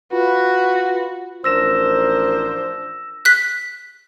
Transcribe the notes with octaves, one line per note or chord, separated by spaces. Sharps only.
F4 F#4 B4
A1 F3 D4 A#4 C5 E6 A#6 E7
F#6 B6